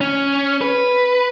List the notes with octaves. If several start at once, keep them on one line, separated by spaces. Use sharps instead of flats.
C#4
B4